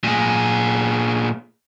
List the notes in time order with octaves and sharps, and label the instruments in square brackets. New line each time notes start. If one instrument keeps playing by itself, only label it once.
[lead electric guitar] A#2 G#4